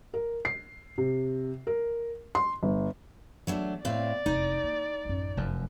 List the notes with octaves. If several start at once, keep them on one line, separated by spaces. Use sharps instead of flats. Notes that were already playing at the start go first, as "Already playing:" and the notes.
A#4
C7
C3
A#4
C6
G1
F#3 A3 D4
A2 C4 D5 F5
F1 E2 D#4
A#3
A1 F#2
F1 F#2 D#3